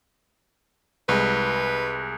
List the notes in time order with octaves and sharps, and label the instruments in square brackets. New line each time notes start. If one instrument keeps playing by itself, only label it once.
[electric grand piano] C2 G#3 [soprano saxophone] B4